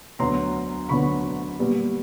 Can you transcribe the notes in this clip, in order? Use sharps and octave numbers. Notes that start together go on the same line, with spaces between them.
D2 D3 F#3 B3 A#5 C6
D2 D3 F#3 B3 B5 C#6
A#2 G3 B3